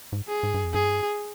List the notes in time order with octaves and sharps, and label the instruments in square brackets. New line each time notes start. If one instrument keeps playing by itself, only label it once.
[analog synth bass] G#2
[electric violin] G#4
[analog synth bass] G#2
G2
F2
[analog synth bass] G2 [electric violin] G#4